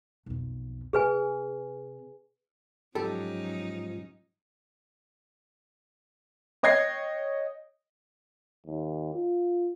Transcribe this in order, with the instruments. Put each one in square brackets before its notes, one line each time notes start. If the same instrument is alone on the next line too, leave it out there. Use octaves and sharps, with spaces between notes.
[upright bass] B1 F2
[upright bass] C3 [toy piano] G#4 B4 G#5
[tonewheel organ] G#2 F3 [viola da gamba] F#3 C#4 D#4 [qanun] G4 [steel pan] A4
[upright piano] C#5 D#5 G5 G#6 A#6 C7
[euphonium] D#2
F4